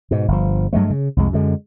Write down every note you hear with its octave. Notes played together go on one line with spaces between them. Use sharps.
G#2 B2
G1 F3
G2 F#3 G#3 A3
C#3
C2 F2 G#3
F#2 D3 G#3